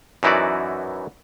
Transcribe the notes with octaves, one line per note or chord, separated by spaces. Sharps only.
F#2 E3 D#4 E4 F#4 D5